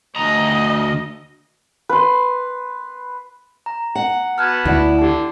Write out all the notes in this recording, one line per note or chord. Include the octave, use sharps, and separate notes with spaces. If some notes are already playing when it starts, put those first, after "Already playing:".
D2 D#5 A#5
B4 C6
A#5
F#5
B3 F#4 A5 F6 F#6 G#6
D2 E4 D5 F#5
D3 G4 A5